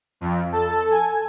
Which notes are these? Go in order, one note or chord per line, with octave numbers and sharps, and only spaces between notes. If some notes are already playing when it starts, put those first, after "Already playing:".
F2
A4
G#5